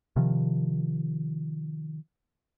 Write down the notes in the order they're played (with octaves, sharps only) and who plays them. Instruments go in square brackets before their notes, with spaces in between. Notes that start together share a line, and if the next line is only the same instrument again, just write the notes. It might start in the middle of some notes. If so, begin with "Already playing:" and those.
[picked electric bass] C3 D#3 F3